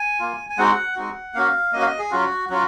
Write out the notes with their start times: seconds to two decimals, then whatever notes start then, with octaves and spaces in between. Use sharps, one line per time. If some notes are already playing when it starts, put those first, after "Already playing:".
Already playing: G#5
0.20 A#3 F4
0.50 G#5
0.58 G#3 C4 D#4 F#4 F#5
0.96 G#3 C4 D#4 F#4
1.34 A#3 C#4 F#4 F5
1.72 A#3 C#4 F#4 D#5
1.81 F5
1.86 D#5
1.98 G#4
2.11 F#3 C#4 F4 F#4
2.49 F#3 C#4 F4 F#4